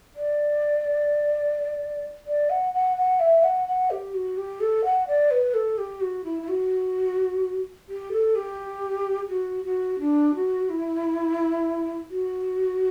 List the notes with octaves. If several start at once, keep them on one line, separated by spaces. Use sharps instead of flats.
D5
D5
F#5
F#5
F#5
E5
F#5
F#5
G4
F#4
G4
A4
F#5
D5
B4
A4
G4
F#4
E4
E4
F#4
G4
A4
G4
F#4
F#4
D4
F#4
E4
F#4